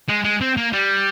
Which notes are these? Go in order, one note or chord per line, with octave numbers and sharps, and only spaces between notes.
G#3
G#3
C4
A#3
G3